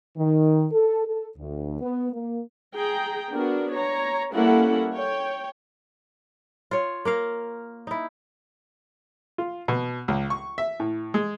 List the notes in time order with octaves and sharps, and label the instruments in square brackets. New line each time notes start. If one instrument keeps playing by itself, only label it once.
[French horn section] D#3
A4
A4
D2
B3
A#3
[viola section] G#4 G5 A#5
B3 D4 F#4 A#4
C#5 A#5
G3 A#3 C#4 E4 A4 F#5
C#5 G5
[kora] F4 C#5
A#3 A#4 F5
D#4 E4
[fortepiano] F4
B2
C#2
C#6
E5
A2
G#3